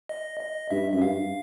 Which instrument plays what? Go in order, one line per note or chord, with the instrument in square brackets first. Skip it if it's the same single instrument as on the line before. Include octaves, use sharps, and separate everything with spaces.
[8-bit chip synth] D#5
D#5
[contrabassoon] G2 [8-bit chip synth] E5
[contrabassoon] F#2 [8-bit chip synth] E5
[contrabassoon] G2 [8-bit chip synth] F5